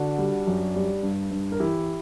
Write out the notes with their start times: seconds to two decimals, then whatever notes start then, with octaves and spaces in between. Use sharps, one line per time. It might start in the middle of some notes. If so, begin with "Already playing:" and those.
Already playing: D3 D4 F#4
0.18 G3
0.47 F#2
0.75 G3
1.03 G2
1.31 G2
1.52 A#4
1.60 E3 E4 G4